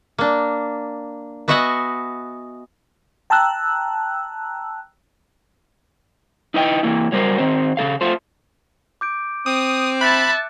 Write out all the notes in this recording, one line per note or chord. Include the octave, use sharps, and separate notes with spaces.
A#3 D4
B3 F#4 D#5 E5 F#5 G#5
G5 A5 A#5 E6 F#6
D#4 E4 B4 D#5 F#5 G5
E3 A#3 E4
F#3 G3 A#4 C5
D#3 C4 C5
C#3 G3 A4 F5
A3 F4 C5
D6 G6 D7
C4 D#6
E5 A5 B5 F#6 A6 C#7